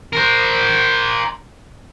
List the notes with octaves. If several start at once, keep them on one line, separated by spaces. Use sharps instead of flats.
A#4 C5